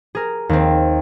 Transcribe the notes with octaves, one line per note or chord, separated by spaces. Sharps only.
G#4 A#4
D#2 C4